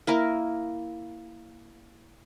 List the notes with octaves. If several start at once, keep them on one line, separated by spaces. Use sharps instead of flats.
A#3 E4 A#4